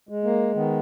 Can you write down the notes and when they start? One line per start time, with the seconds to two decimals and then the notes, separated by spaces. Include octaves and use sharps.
0.09 G#3
0.24 A#3
0.55 D#3 B3